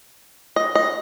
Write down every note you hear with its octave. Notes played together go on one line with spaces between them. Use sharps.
D#5
D#5